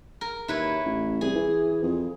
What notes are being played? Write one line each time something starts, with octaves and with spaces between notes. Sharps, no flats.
A#4
D#2 E4 B4 C#5
A1
C2 G#4
E3
F2